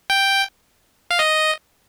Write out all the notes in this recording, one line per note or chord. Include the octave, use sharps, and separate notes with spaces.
G5
F5
D#5